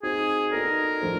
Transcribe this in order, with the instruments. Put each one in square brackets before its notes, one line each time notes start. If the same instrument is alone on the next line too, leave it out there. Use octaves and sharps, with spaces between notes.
[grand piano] C4 D#4 F#4 [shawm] G#4
[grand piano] B3 D#4 F#4 A4 D5 [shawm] A#4
[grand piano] F3 A3 D4 G4 C5